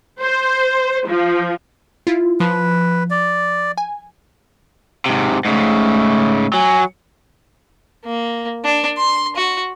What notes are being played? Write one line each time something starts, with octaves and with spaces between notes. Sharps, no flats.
C5
F3
E4 F4
F3 B4
D5
G#5
G#2 C3
G#2 C#3 A3
F#3 G#5
A#3
D4
C6
F#4